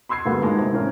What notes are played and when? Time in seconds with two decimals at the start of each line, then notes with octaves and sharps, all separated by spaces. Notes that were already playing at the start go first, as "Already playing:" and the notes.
0.09 B5 C6 E6 G#6 C7
0.25 G2 D3 G#3 A#3 B3 F#4
0.42 G#1 A#2 G#3 A#3 A5
0.58 C3
0.73 A1 C#4 A#4